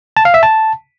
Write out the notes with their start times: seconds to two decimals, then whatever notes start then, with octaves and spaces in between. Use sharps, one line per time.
0.17 A5
0.25 F5
0.34 E5
0.43 A5